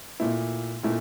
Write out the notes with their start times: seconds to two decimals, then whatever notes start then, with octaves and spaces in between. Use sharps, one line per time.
0.20 A#2 A3 E4
0.83 A#2 A3 E4